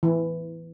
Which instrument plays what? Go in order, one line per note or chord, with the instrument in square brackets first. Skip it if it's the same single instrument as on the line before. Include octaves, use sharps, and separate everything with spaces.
[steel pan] E3